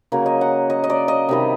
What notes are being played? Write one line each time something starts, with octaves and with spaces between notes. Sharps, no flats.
C#3 F#3 A#3
D#5
F#5
D#5
D#5
D5
D#5
C3 D#3 G3